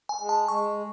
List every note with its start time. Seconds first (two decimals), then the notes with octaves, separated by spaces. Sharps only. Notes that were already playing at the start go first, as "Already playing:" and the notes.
0.09 G#5
0.19 G#3
0.29 A5
0.48 G#3 C#6